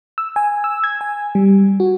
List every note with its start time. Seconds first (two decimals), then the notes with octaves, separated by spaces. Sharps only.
0.18 E6
0.36 G#5
0.64 E6
0.84 G#6
1.01 G#5
1.35 G3
1.80 F#4